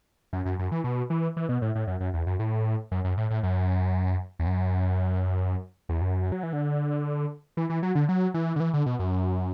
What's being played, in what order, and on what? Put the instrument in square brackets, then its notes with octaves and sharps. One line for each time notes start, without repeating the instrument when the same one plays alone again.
[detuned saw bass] F#2
F#2
F#2
E3
B2
E3
E3
B2
A2
A2
F#2
F#2
E2
F#2
A2
F#2
F#2
A2
A2
F#2
E2
F#2
E2
F#2
F#3
E3
D3
E3
E3
F#3
D3
F#3
E3
D3
E3
D3
B2
F#2